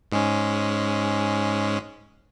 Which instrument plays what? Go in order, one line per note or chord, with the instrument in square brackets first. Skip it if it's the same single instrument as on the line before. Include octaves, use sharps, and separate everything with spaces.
[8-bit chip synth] G#2 G#3 C#4